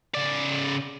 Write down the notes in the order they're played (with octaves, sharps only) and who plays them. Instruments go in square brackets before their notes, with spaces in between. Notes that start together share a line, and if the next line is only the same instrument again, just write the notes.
[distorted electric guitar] C#3 D5